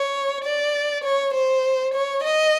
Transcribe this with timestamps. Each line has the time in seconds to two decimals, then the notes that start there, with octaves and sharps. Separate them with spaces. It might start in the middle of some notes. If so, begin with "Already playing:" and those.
Already playing: C#5
0.44 D5
1.04 C#5
1.34 C5
1.94 C#5
2.24 D#5